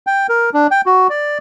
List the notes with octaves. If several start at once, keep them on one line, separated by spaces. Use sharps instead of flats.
G5
A#4
D4
G5
F#4
D5